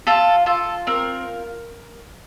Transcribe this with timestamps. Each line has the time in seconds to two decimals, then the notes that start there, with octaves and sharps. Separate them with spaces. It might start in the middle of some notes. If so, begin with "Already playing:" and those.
0.07 F4 A4
0.46 F4 A4
0.87 C4 A#4